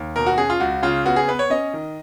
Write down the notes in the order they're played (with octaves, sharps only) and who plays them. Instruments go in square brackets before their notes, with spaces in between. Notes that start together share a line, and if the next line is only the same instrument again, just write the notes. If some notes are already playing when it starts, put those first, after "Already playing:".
Already playing: [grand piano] D#2
B2 A#4
F#4
C#4 G#4
F4
C#2 F#4
C#3 F4
B3 F#4
G#4
B3 B4
C#5
C#4 D#5
D#3